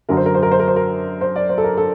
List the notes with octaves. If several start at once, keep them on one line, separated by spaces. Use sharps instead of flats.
F#2 D3 F#3 A#4
C5
A#4
C5
A#4
C5
A#4
C5
A#4
C5
D5
C5
A4
A#4
A4